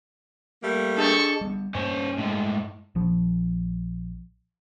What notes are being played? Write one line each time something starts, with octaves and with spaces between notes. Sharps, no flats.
G3 A3 A#3
D4 G#4 A4 D#5 C#6
G3 B3
G2 A#3 C#4 C5
A2 G#3
A#1 F3